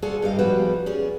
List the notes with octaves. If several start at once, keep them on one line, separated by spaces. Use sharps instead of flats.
F4 F#4 G#4 A4 D5
G2 G4 D#5 F5
F3 G3 G#3 B3 F#4 B4
C#4 G#4 D5